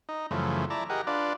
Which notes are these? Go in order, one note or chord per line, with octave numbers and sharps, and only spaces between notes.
D#4
F#2 C#3 E3 F3 A3
E4 D5 A5 A#5
G4 G#4 A#4 D#5 F#5
D4 F4 B4 D5